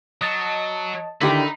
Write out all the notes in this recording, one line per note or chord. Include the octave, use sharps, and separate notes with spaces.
F#3 D#5 A5
D3 D#3 D#4 E4 G4 G5 B5